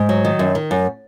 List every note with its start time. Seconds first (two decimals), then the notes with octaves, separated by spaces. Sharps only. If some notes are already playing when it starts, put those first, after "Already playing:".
Already playing: G#2
0.09 F#3
0.25 D#3
0.39 F#2
0.55 D#3
0.71 F#2